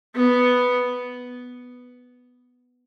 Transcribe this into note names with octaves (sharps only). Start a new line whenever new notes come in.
B3